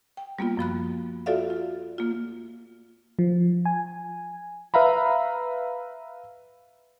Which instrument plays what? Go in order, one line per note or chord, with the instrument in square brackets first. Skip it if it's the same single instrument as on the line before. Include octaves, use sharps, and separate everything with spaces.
[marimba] G5
G3 A#3 B3 F4
F#2 F3 B5 F#6
F4 F#4 A4 D5 E5 F5
F4
A#3 F4
[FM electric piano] F3
G#5
[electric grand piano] B4 E5 F5 A#5 B5